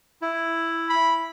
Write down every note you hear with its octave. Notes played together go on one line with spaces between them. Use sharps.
E4
B5